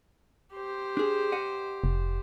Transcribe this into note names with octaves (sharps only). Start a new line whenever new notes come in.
G4 C5
D4 G#4
D#5 F#5
F1